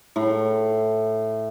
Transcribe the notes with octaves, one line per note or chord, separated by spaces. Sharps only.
A2